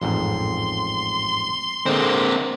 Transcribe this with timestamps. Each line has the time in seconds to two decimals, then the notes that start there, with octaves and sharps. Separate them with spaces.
0.01 A1 F2 G#2 C6
1.86 D3 G#3 A#3 C4